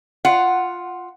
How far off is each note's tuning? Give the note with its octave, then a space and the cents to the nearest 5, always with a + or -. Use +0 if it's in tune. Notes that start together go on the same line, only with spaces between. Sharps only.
F4 +0 F#5 +0